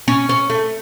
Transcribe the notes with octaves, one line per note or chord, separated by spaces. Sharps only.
C#4
C#4
A3